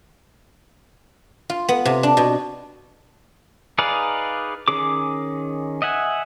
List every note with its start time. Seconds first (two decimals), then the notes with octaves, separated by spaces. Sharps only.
1.50 F4
1.69 B3
1.85 C3
2.03 D4
2.17 B2
3.78 D#4 G#4 B4 D5 F5
4.68 D#3 C#4 G#4 D6
5.82 D#5 E5 F#5 G#5